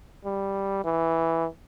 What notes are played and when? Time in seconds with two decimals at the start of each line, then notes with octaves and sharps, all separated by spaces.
0.25 G3
0.84 E3